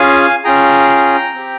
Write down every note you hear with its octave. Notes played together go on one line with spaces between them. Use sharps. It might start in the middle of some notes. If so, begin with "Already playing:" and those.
Already playing: C#4 F4 G#4 F5 G#5
C#4 F4 G#4 G5 A#5
C4 G4